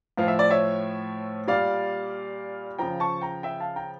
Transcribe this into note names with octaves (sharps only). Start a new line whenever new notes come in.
A2 F3 F5
E5
D5
C#5 E5
A#2 G3 D5 F5
C#3 F3 G5 A#5
A5 C#6
G5 A#5
E5 G5
F5 A5
G5 A#5